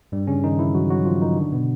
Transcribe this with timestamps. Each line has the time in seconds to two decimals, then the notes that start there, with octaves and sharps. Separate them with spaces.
0.12 G2 G3
0.27 C#3 C#4
0.44 D#3 D#4
0.59 E3 E4
0.74 F#3 F#4
0.90 F#3 F#4
1.05 F3 F4
1.22 D#3 D#4
1.37 D3 D4
1.52 B2 B3